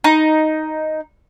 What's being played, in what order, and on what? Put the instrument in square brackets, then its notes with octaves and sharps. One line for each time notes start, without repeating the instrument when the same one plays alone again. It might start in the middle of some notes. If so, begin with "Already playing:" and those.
[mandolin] D#4